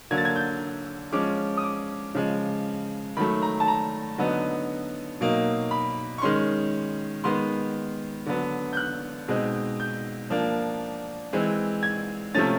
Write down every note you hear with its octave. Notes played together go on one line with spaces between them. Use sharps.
D3 F#3 A#3 G#6
A6
G#6
G6
F3 G#3 C#4 D6
D#6
D6
C#3 F3 G#3
D#3 F#3 A3 B5
A#5
A5
A#5
D3 F#3 B3 D#4
B2 F#3 A#3 D#4
B5
C#6
D#3 G#3 C#4 C6
D#3 G#3 B3 C6
D3 F#3 B3
G6
F#6
B2 G#3 C4 D#4
G6
F3 A#3 D4
E3 G#3 C4
G#6
C3 F3 A3 C#4 A6